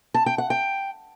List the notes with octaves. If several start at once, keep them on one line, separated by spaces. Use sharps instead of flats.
A5
G5
F#5
G5